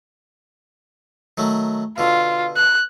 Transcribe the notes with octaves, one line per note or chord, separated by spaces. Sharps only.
D#3 F#3 A3
B2 D3 F4
F#6